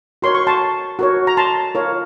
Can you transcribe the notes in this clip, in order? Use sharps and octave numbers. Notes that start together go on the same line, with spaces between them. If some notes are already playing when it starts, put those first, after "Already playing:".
F#4 A#4 C#5 C6
C#6
A5 C6
F#4 A#4 C#5
A#5
A5 C6
F4 A#4 C#5